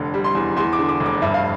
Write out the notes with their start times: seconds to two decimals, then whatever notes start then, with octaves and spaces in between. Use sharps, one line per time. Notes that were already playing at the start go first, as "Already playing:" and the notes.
Already playing: F1 D3
0.14 G3
0.24 C6
0.35 E2
0.57 E2 C6
0.73 D6
0.79 D3
0.89 D6
1.00 F1
1.06 D6
1.22 G2 E5
1.34 F5